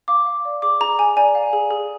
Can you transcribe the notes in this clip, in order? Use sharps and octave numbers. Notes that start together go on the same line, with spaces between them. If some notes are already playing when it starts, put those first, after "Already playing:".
F5 D6
F5
D5
G#4 D6
G#4 A#5
G#4 G#5
D5 G#5
F5
G#4
G#4